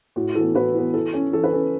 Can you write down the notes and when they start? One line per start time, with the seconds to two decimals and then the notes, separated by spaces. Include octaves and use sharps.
0.16 A2 F#4
0.35 E3 B3 A4
0.55 A2 F#4 B4
0.74 E3 B3
0.94 E3 A4
1.13 C#4
1.33 E3 A4
1.44 B4
1.52 C#4 A4